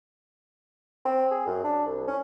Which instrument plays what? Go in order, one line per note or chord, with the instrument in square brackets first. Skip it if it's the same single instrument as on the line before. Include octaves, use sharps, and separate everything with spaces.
[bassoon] C4
G#4
F#2
D4
C2
C#4